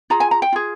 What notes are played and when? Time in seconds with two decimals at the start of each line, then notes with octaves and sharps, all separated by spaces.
0.10 F4 G#4 A#5
0.20 G#5
0.31 A#5
0.42 G5
0.53 F4 G#4